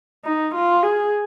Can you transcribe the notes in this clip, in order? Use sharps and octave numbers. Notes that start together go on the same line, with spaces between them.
D#4
F4
G#4